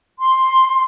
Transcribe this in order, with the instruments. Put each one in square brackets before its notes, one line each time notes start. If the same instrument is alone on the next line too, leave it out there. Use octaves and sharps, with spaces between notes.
[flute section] C6